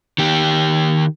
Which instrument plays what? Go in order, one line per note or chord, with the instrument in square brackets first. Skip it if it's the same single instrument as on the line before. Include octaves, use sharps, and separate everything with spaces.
[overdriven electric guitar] D#3 G4